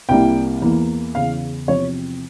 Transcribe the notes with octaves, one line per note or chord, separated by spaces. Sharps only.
C2 C3 G3 A#3 E4 G5
E2 E3 A#3
E2 C#3 E3 F5
E2 C3 F3 C4 C#5